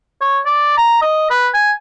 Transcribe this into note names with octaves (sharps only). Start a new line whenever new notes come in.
C#5
D5
A#5
D#5
B4
G#5